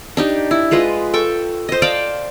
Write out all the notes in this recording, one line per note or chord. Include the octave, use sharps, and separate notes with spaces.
D4 D#4 G4
E4
G#3 F4 B4 D#5
A4 G5 C#6
C5 D#5
D5 F5 G5 A5